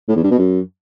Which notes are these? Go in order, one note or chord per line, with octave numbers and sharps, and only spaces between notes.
A2
E2
G2
B2
F#2